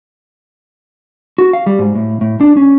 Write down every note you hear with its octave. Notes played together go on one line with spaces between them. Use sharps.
F#4
F5
G3
G#2
A2
A2
D4
C#4